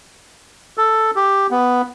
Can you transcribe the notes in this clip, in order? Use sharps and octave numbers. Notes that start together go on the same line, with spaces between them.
A4
G4
B3